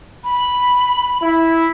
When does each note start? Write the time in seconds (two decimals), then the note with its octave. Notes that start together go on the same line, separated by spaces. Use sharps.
0.24 B5
1.22 E4